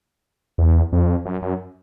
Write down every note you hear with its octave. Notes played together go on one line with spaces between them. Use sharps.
E2
F2
F#2
F#2